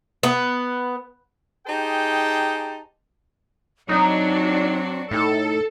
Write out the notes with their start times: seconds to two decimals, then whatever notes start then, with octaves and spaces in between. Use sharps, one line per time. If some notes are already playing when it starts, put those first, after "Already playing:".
0.23 B3
1.67 D#4 G4 G#4 C5 G5 A5
3.89 F#3 C4 D4 D#4 F#4
5.11 A2 D#4 A4